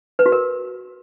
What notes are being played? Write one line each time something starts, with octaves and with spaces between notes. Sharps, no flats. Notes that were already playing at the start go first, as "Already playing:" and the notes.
B4
F#4
A#4